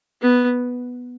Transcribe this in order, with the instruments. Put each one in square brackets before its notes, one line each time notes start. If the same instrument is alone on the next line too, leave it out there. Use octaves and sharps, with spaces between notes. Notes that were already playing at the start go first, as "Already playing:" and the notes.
[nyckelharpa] B3